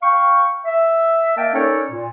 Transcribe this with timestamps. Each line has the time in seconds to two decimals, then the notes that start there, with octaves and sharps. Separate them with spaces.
0.02 F5 G5 C#6
0.65 E5
1.37 A#3 A#4 D#5 E5 G5 A5
1.54 C#4 D#4 A4 A#4 C#5 D5
1.91 A#2